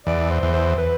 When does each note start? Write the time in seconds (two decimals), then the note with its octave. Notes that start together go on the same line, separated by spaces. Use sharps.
0.06 E2 D5
0.30 C5
0.43 E2
0.54 C5
0.78 B4